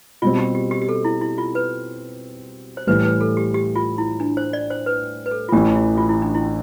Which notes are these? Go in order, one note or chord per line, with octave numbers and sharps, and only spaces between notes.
B2 G3 C4 F4
G4
G4
G4
G4
A4
E4
E4
F4
B4
C5
A2 E3 G3 B4
B4
A4
G4
G4
F4
E4
D4
C5
D5
C5
B4
B4
A4
F4
A1 A2 E3 G4
E4
F4
E4
D4
E4